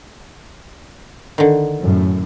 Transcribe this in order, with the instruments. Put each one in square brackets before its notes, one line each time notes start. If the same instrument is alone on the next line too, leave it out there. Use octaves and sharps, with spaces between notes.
[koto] D3 D#3
[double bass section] F#2 A2